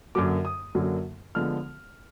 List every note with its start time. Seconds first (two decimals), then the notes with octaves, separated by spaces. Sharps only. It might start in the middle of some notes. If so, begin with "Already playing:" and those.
0.15 F#2 D3 F#3 A#3 D6
0.45 D#6
0.75 F#2 D3 F#3 A#3
1.35 D3 F3 G#3 B3 F6